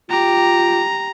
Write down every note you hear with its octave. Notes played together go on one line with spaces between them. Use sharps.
F4 G4 A#5